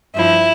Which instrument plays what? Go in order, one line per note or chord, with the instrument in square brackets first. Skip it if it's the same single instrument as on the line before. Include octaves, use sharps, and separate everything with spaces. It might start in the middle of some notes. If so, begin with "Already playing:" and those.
[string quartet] G2 F3 E4